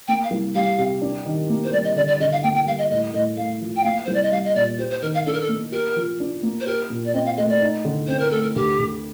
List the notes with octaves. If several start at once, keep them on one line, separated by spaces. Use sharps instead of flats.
A#3 G5
F5
C2
G3 F5
C3
D4
D#3
A#3
C5
G3 D5
D#5
D3 D5
D5
D3 D#5
F5
A#3 G5
G5
G3 F5
D#5
A2 D#5
A2 D#5
A3 F5
F3
G5
A#3 F5
C2 C5
D5
D#5
G3 F5
D#5
A#2 D5
G4 C5
C5
D#3 A#4
F5
D4 A4
A#4
A4
A#3
G4 A#4
F3
D4
A#3
C5
G4 A#4
A#2
D5
C4 D#5
F5
A3 D#5
D5
D#4
D3
C4 C5
A#4
A3 A4
A#4
D2 G4
D2